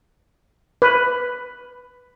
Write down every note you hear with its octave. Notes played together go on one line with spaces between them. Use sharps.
B4